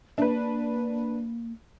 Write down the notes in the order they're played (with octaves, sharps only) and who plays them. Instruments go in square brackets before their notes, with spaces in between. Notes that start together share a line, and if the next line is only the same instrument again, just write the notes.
[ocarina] A#3 [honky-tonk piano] D4 B4